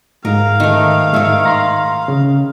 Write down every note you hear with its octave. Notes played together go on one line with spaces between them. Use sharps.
G#2 A#4 F5
D#3 A3
G#2 D#3 C#5 E5
A#5 C6
C#3